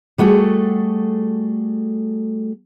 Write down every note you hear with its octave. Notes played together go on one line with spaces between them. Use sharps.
G3 A3 F#4 G#4 A4